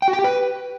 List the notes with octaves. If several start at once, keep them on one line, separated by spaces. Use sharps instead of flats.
G5
F#4
G5
G4
B4